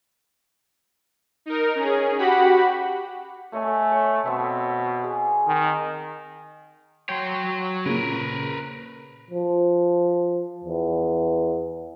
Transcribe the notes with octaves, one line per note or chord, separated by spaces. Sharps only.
D#4 A#4
C#4 G#4
F#4 G4 F#5 B5
A3 C#5 D#5 G#5
C#5
B2 C4 E5
G#4
D#3
F#3 C#5 G5 C6
A#2 C#3 A#4 B4
F3
E2